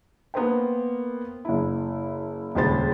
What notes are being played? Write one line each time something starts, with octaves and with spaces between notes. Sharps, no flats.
A#3 B3 A#4 C5 G5
F#1 E4
D#1 C#2 C#3 C5 B5 A6